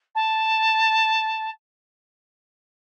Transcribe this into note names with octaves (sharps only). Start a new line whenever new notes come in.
A5